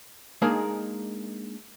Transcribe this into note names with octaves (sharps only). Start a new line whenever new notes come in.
G#3 A#3 D4 D#4 G#4 A#4